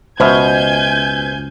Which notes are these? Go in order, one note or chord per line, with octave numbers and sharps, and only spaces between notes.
C#2 B2 C5 E5 G#5 F6 G6 G#6